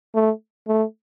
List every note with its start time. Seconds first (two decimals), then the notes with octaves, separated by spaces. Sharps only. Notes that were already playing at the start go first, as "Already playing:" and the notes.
0.15 A3
0.68 A3